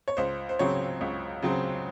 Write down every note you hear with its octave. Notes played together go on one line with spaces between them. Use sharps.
C#5
C#2 C5
C5
C#3 F#3 C4 C#5
C#2
C#3 F#3 C4